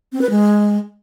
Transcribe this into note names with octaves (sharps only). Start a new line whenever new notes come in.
C4
B4
G#3